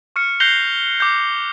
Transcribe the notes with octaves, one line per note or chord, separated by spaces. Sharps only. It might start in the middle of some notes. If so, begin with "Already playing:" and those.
C#6 F6 C#7
F#6 G6 A#6 C7 F7 G7
D6 G6